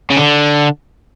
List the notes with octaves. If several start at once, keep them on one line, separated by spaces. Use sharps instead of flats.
C#3
D3